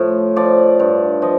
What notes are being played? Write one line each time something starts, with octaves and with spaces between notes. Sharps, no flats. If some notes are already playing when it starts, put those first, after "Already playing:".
Already playing: A2 F3
F3 D5
G2
F3 D#5